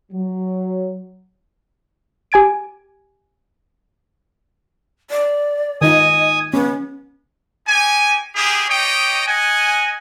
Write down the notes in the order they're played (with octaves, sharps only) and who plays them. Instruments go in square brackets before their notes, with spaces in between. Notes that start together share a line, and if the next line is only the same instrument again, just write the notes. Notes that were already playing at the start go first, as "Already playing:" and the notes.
[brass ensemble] F#3
[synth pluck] G4 G#5 G#6 D7
[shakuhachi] D5
[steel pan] D#3 D#4 F4 [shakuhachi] D#5 [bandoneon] G#5 D#6
[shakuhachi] B3 [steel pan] C#4
[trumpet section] D#4 G4 G#5
A#3 E4 G4 G#4
D#4 G4 C#5 D#5 G5
D#5 F#5 G#5